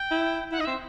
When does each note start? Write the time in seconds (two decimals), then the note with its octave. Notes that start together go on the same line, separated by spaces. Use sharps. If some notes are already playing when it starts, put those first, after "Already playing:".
Already playing: G5
0.11 E4
0.51 E4 F#5
0.59 D#4 D#5
0.65 C4 E5